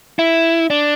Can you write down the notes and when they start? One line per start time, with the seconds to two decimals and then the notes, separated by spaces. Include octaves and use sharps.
0.19 E4
0.70 D4